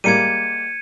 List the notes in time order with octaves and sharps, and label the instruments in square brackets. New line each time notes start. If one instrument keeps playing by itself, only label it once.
[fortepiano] G3 G#3 A#3 [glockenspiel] G#6 C#7 D#7